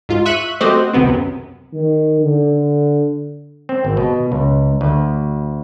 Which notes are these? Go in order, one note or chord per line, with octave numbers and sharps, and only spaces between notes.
G#2 F4
E5 C#6 F#6 B6 D#7
A3 C4 F#4 G4 C5 D#5
C#2 C3 D#3 B3 C4
F#2
D#3
D3
C4
G#1
B2
C#2
D2